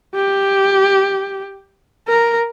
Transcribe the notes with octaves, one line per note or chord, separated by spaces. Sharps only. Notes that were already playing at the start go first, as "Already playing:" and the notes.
G4
A#4